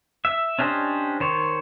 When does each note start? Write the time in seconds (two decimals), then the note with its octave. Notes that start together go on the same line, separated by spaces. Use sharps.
0.25 E5
0.59 C#4 D4 G4 C5 D#5
1.20 D#3 C5 C#5